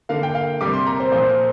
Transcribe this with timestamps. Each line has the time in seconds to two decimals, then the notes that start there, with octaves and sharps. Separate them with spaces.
0.09 D3 A#3 F5
0.23 G5
0.35 F5
0.61 C3 G3 A#3 D6
0.73 C6
0.87 A#5
1.00 C5
1.12 A#2 F3 A#3 C5
1.29 A#4